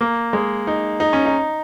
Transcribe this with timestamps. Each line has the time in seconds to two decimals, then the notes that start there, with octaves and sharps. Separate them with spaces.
0.01 A#3
0.33 G#3
0.67 D#4
1.00 D#4
1.13 C#4
1.26 D#4